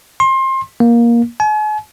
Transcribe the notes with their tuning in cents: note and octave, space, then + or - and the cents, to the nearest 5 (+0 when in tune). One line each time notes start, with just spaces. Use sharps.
C6 +25
A#3 +15
G#5 +45